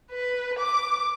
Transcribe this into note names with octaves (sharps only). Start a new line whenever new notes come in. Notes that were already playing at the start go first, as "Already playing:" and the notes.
B4
D6